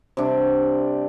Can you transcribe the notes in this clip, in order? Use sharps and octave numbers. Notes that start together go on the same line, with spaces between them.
C3 G3 D4